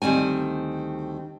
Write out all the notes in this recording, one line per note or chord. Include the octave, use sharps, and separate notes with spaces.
D2 D#3 G3 C4 G#5